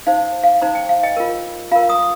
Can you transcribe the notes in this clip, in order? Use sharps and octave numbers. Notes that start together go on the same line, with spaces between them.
D#4 C5 F5
F5
D#4 C5 A#5
G5
F5
D#5 G5
F4 A#4
F4 A#4 F5 A#5
A#5 D#6